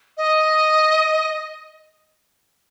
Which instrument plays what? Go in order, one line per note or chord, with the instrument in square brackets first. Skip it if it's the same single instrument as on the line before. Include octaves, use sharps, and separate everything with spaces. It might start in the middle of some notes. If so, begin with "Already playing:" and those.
[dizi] D#5